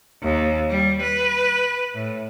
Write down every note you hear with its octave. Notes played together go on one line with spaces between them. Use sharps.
D#2
G3
B4
A2